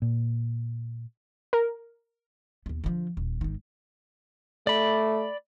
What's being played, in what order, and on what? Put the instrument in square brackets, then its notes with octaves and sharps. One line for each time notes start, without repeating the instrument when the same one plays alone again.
[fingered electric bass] A#2
[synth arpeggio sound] A#4
[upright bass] D#2 B3
D3 F3
D#1
G#1 D#3
[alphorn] A3 [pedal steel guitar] D5 B5